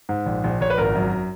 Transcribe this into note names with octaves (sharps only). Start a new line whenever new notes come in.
G#2
A#1
A#1
A#1 C#5
B4
G#1 A#4
F#2